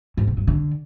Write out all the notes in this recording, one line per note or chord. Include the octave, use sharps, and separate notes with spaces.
G#2
C3
G2
D3